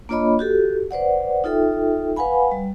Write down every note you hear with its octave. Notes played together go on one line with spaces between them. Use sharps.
A#3 D4 F4 C#5 D#5 B5
F#4 G4 A4
B4 C5 D5 F#5
D#4 F4 A4 E5 G5
B4 F5 F#5 G#5 B5
G3